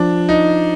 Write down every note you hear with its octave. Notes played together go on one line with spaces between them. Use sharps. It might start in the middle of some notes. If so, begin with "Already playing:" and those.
Already playing: F3 D4
D#4